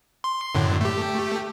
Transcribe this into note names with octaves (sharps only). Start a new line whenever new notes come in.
C6
F#2 A2 D3
A3 G4